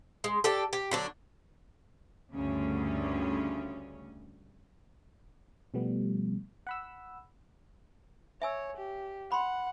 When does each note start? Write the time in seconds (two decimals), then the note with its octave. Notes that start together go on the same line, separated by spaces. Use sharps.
0.24 G#3
0.44 D4 G4 A4
0.73 G4
0.91 D3 F#3 D4
2.34 D2 G2 C#3 C#4
5.74 B2 F3 G3 A3 B3
6.67 F#5 B5 E6
8.42 C#5 E5 G#5 E6
8.77 G4
9.32 F#5 B5 C6